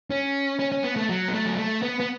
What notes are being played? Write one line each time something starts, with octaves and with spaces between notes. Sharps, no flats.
C#4
C#4
C#4
B3
A3
F#3
B3
A3
F#3
A3
B3
B3